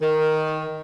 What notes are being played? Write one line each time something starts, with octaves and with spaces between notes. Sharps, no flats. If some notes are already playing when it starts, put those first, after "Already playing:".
D#3